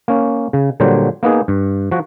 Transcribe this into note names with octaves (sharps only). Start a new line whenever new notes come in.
A#3 C#4
C#3
A#2 D3 F#3 G3 C5
A#3 B3 D#4 G#4
G2
F3 F#4